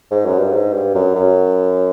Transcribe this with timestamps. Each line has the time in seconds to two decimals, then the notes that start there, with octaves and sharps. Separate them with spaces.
0.11 G#2
0.25 F#2
0.39 G2
0.53 G#2
0.73 G2
0.95 F#2
1.15 F#2